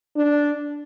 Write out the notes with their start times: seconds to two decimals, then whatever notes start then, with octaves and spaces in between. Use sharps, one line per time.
0.16 D4